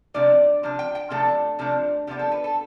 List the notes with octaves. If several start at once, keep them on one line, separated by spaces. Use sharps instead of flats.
C3 F3 A3 D4 D5
C3 F3 D4
G5
G5
C3 F3 A3 D4 A4
C3 F3 A3 D4
C3 F3 B3 D4 G4
A4
B4
A4